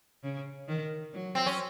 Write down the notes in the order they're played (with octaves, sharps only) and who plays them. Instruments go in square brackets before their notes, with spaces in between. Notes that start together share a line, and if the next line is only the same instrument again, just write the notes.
[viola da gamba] C#3
D#3
F#3
[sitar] C4
C#4